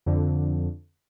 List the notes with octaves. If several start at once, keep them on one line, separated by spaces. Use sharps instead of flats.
F2 D3